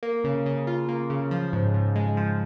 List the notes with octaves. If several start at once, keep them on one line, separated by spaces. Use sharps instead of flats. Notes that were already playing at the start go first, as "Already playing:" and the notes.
A#3
C#3
C#3
F4
A#3
C#3
F3
G#2
G#2
G#3
F3